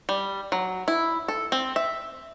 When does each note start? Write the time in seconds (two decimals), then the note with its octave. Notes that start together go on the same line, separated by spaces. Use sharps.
0.09 G3
0.52 F#3
0.88 E4
1.28 A4
1.52 C4
1.76 E5